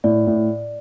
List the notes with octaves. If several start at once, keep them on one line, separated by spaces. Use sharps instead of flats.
A2 D5
A2